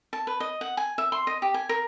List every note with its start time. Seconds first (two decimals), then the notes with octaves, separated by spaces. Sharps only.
0.13 A5
0.27 B4
0.40 D#5
0.61 F#5
0.77 G#5
0.98 E5
1.12 C6
1.27 D#5
1.42 G4
1.54 G#5
1.69 A#4